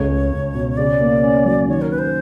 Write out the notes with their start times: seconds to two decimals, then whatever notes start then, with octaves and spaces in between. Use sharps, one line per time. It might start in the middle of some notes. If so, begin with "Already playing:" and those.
Already playing: C#2 A3 C#5
0.09 G#3
0.32 C#2
0.54 B2
0.77 C#3 D5
1.01 A#3
1.23 C#4
1.45 F#3
1.69 D#3 C#5
1.82 A#4
1.91 C#4 B4
1.99 C5